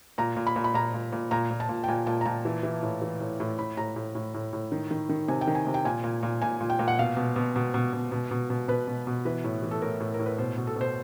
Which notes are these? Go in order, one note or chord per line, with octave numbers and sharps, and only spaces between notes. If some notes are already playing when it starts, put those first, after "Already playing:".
A#2 A#5
A#2
B5
A#2
B5
A#2 A#5
A#2
A#2
A#2 A#5
A#2
A5
A#2
G5
A#2 G#5
A#2 A5
A#5
A#2 A5
E3
E3
A2
E3
A2
A2
A2 B5
A2 A#5
A2
A2
A2
A2
D#3
D#3
D#3
C3 G#5
G5
D#3
G#5
C3
G5
A#2 G#5
A#2
A#2
A#2 G#5
A#2
G5
A#2
F#5
B2 F5
B2
B2
B2
B2
B2
B2
B2
B2
B2 B4
B2
B2
E3 B4
A2
E3
A4
A2 A#4
A2
A#4
A2
B4
B2 C5
B2
A4
B2 C5